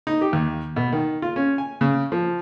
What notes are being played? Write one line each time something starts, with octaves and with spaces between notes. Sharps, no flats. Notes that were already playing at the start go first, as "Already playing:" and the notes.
D#4
G4
D#2
B2
D#3
F4
C#4
G#5
C#3
F3